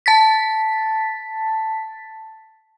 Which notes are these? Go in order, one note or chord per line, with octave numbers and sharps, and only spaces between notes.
A5 A6 B6